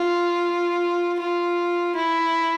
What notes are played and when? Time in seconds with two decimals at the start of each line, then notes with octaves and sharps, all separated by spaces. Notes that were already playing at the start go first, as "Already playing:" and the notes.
Already playing: F4
1.20 F4
1.95 E4